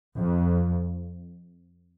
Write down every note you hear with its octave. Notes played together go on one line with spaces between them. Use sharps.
F2